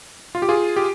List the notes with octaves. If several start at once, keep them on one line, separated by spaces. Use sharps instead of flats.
F4
G4
F4 G#4
G4